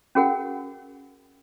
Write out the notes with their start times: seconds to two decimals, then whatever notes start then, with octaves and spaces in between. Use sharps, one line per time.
0.15 C#4 F#4 G#4 A#4 F#5